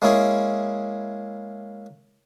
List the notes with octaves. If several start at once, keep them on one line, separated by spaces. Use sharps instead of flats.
G#3 A#3 C#4 E4 G#4